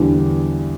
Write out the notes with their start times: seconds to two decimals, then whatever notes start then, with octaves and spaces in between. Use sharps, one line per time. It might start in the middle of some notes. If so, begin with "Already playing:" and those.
Already playing: E2 D3 G3